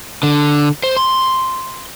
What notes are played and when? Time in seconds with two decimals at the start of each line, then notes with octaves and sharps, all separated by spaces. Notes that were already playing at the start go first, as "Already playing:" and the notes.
0.23 D3
0.83 C5
0.96 C6